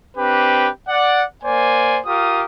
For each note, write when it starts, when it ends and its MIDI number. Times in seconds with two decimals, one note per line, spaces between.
0.16 0.69 60
0.16 0.69 62
0.16 0.69 67
0.16 0.69 71
0.89 1.23 74
0.89 1.23 78
1.43 2.00 58
1.43 2.00 72
1.43 2.00 74
1.43 2.00 80
2.06 2.45 65
2.06 2.45 67
2.06 2.45 70
2.06 2.45 87